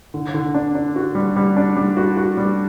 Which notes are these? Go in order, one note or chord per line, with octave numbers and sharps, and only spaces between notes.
D3
D3
D4
D4
F#4
G3
G3
D4
G3
F#4
F#4
G3